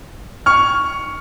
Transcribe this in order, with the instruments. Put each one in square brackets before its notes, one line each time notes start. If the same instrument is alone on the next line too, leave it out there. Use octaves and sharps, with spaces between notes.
[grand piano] C#6 F6